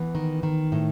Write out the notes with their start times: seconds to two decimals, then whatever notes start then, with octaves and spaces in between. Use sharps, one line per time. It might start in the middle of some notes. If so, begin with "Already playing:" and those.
Already playing: E3 B3
0.15 D#3
0.43 D#3
0.72 A2